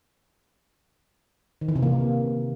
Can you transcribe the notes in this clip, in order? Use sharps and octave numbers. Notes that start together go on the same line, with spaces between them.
D#3
E3
C3
A#3